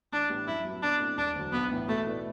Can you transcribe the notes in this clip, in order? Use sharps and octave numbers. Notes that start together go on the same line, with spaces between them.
A1 D4
A2 G3 B3 E4
F#2 E4
F#3
B3
B2 D4
A3 C4 E4
E1 D4
D2 D3 F#3
B1 B3
A2 E3
B2 A3
A3 E4 B4 D5